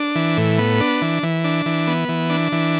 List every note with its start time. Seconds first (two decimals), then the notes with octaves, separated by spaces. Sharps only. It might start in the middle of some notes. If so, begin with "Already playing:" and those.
Already playing: D4
0.15 E3
0.37 A2
0.58 B3
0.80 D4
1.02 E3
1.23 E3
1.44 D4
1.66 E3
1.87 B3
2.09 E3
2.30 D4
2.52 E3